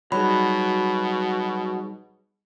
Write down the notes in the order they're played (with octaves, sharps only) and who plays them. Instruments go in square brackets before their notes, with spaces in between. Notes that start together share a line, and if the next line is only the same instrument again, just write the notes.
[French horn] B2 [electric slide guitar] F#3 [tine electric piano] G3 D#4 G#4 [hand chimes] B5